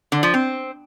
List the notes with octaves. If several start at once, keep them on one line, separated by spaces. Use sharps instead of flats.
D3
F3
C4